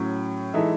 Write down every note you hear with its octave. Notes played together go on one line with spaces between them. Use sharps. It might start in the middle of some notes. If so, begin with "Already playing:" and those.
Already playing: A2 F#3 C#4
E3 G#3 D#4 A4 E5